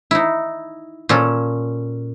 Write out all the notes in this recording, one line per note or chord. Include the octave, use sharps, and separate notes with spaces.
D#4 E4
A#2 C#4 A4